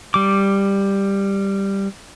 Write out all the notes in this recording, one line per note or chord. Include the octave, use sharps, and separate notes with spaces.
G3 D6